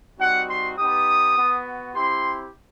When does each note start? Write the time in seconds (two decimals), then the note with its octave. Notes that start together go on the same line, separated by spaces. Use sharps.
0.19 G3 C4 D#4 F#4 F#5
0.49 C6
0.78 B3 D#4 G4 D#6
1.36 B3 F#4
1.94 C4 E4 G4 C6